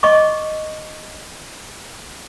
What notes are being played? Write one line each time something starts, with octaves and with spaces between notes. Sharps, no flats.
D#5 C#6 D6